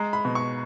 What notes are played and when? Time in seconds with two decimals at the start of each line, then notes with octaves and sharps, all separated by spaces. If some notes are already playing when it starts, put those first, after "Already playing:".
Already playing: G#3 A#5
0.13 B5
0.25 B2
0.35 C#6